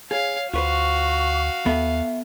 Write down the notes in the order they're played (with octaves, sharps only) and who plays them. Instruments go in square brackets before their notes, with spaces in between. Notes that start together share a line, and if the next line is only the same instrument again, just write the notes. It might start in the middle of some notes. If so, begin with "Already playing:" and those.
[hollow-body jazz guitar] G#4 [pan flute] C#5 [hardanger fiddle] F5
[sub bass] D2 [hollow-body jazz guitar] F4 B4 C5 [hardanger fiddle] F#4 F5 [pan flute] C#6
[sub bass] D#2 [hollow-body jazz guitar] B3 A4 [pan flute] E5